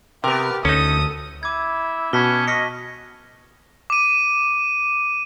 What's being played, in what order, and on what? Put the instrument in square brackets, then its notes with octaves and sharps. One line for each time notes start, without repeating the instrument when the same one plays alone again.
[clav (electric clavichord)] C3 [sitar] B3 A#4 [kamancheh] G4
[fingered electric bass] D2 [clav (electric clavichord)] C#4 D#4 [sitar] A4 [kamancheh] D#6
[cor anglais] E4 [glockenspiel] D6 G#6
[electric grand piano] B2 [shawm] C#4 [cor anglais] B4 [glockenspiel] A5 B6 G7
[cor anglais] F#4 [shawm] D#5 [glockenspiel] F6 B6 C#7
[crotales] D6 D#7